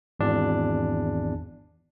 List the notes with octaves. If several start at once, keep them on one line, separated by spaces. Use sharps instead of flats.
G#1 E2 D4